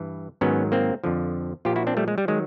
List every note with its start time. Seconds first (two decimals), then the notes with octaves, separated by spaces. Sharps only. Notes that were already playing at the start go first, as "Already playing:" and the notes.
Already playing: G2 E3
0.41 G#2 D#3 F#3 B3 C#4
0.72 A#3 C4
1.04 F2 D3 F3
1.65 A#2 F3 F4 G4
1.76 E4 F#4
1.87 C4 D4
1.97 G3 A3
2.08 G#3
2.18 G3
2.28 D#3 F#3 G#3